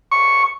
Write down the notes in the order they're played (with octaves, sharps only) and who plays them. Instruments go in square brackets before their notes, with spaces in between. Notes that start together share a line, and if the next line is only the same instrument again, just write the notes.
[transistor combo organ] C#6